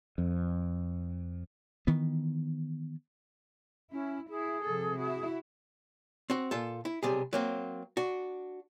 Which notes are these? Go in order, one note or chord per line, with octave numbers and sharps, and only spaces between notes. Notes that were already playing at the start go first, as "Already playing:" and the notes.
F2
D#3 E3 B3
C#4 E4
E4 G#4
C3 F3 A4
E4 F#4
C4 F#4
A#2 F4 A4
E4
B1 C3 G3 G#4
F#3 A#3 C4
D4 F#4